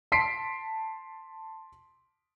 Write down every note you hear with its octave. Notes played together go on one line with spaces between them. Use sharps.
A5 C6 B6 C7 D7